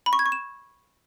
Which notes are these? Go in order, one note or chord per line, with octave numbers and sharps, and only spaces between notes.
B5
C#6
G#6
C#6
E7